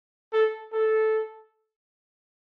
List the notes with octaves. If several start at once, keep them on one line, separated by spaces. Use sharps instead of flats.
A4
A4